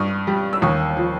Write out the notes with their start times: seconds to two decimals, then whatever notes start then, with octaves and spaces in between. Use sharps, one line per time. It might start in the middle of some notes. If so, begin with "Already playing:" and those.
Already playing: G2 C#6 D#6
0.27 G3
0.53 E6
0.62 D#2 C#6 D#6
0.97 F3